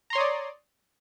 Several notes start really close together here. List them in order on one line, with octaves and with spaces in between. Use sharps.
A#5 C6 C#5 D#6 D5